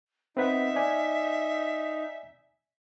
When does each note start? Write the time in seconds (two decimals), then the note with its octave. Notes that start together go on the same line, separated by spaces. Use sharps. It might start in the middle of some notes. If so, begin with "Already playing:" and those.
0.37 C4 D#4 B4 E5 F#5
0.76 D5 G#5